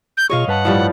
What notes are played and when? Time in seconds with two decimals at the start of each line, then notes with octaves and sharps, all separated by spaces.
0.17 G6
0.30 B2 F4 G#4 C#5 D#5 F5 C#6
0.48 G2 B4 F#5 A5
0.65 A2 F3 G3